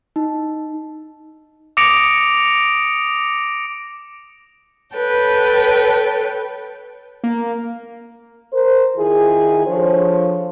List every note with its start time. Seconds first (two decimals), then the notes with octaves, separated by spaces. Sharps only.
0.16 D#4
1.77 D6 D#6 A#6 C#7 D7 F7
4.95 A4 B4 C#5 G5
7.24 A#3
8.53 A#4 C5
8.97 D#3 E4 F4 G#4
9.66 F3 D4 A4 C5 C#5